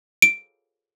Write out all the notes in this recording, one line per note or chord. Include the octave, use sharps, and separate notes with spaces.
D7